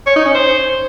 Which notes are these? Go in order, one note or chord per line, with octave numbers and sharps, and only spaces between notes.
C#5
D#4
C#4
C5